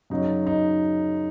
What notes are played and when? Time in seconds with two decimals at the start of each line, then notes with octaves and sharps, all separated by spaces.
0.10 F#2 C#3 F#3 D#4
0.47 D#4